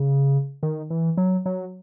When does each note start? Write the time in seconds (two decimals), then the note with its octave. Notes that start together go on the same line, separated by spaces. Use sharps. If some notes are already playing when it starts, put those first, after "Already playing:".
Already playing: C#3
0.63 D#3
0.90 E3
1.17 F#3
1.46 F#3